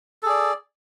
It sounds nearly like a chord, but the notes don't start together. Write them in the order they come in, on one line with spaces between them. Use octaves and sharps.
A4 G#4 D5